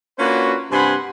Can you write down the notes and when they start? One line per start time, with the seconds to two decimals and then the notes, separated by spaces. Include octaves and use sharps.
0.19 A#3 C#4 D4 F4 F#4 B4
0.71 G2 C3 F#5 G#5 B5 C6